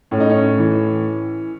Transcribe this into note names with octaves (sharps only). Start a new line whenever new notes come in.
A2 C#4
D#4
C#4
E3